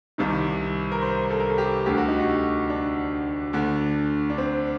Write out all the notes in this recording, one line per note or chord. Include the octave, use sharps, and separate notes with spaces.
C2 C3 D#3
A#4
C5
A4
A#4
A4
G4
D2 D3 G4
F#4
D#4
F#4
D4
D2 D3
D4
C4